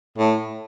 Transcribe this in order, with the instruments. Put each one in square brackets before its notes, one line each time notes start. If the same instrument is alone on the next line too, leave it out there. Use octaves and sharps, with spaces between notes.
[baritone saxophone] A2